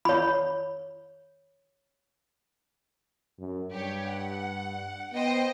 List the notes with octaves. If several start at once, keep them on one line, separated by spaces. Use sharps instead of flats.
C#5 B5
F#2
G2 G4 C#5
F#5
B3 C5 D#5 G5